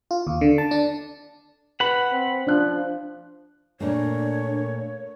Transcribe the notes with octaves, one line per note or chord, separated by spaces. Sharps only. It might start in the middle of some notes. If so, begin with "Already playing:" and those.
F4
D#2
D3
A5
D4
B4 F#5 B5
C4
F3 D4 F#6
A#2 A3 A#3 D4 C#5